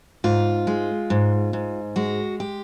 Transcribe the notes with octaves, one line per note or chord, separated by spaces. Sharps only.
G#2 F4
G#3
G#2
G#2
G#3 F#4
G4